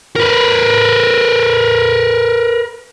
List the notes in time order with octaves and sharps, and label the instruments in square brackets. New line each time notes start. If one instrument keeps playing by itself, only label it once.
[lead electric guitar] A#4 B4